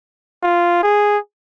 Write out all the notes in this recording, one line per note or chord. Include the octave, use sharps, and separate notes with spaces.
F4
G#4